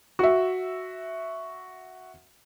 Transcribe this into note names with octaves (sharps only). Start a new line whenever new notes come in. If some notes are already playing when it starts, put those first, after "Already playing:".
F#4 E5